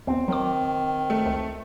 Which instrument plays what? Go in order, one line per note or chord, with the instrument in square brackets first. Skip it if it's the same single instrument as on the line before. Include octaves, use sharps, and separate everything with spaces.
[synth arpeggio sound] D#2 B3 [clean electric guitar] C4
[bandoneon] D#3 [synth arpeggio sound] F#3 D6
[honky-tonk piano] A3
[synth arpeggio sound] C#2